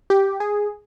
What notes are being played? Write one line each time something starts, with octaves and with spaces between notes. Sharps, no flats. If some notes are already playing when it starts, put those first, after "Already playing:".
G4
G#4